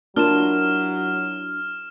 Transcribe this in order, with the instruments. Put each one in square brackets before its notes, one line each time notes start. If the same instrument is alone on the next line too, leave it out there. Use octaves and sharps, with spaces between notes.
[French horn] F#3 [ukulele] D4 [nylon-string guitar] E4 F4 A#4 [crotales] F6 E7